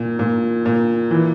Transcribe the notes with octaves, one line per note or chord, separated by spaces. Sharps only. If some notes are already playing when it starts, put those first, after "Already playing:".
Already playing: A#2
A#2
A#2
E3